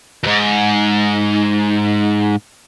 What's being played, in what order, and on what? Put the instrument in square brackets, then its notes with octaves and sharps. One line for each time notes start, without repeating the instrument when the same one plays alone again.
[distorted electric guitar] F2 G#2